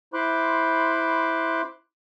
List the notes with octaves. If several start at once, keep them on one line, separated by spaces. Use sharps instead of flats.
E4 C5 B5 C6 D6 F#6